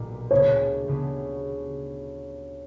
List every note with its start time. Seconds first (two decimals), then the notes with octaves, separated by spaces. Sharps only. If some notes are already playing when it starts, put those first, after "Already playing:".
Already playing: B1 A#2 G3
0.31 D2 C#3 G3 B3 E4 C#5
0.88 D2 C#3 G3 B3 E4